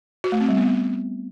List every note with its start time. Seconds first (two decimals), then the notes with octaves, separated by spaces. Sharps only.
0.24 F#4
0.32 A3
0.40 C4
0.49 G3
0.57 B3